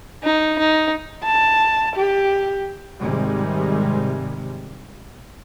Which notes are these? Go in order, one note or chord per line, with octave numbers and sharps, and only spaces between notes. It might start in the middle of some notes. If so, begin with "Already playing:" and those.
D#4
D#4
A5
G4
G#2 C3 D#3 G3 G#3